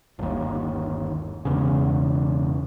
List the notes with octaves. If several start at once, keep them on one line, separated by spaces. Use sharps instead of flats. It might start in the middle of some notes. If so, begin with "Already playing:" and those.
G1 D#2
E1 E2 C#3